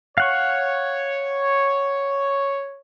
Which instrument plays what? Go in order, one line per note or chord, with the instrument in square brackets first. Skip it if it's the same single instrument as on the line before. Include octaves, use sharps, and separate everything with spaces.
[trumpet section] C#5 [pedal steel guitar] F5 F#5 C#6